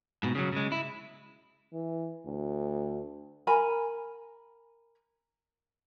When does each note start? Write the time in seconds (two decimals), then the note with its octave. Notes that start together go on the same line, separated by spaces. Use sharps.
0.23 G#2 B2
0.35 C#3 F#3
0.52 C#3 G#3
0.72 E4
1.73 E3
2.26 D2
3.47 A#4 G#5 A#5 B5